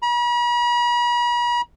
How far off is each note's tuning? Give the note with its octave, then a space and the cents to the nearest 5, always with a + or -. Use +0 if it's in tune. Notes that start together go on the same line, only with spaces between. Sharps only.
B5 -45